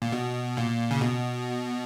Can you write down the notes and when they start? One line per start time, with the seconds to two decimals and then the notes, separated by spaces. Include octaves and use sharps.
0.02 A#2
0.12 B2
0.57 A#2
0.91 C#3
1.01 B2